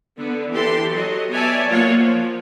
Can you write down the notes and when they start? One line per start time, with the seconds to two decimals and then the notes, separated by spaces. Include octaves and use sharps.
0.17 D3 B3
0.51 E3 G4 A4 C6
0.90 F#3 D#5
1.30 B3 C#5 D5 E5 G#5 A5
1.66 F#3 A#3 F4 C#5 F#5
1.97 F3